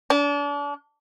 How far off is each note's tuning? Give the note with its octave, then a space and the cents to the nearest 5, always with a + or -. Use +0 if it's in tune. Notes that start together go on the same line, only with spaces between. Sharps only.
D4 -35